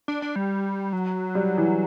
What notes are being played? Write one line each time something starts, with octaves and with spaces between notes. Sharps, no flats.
D4
D4
G3
F#3
G3
E3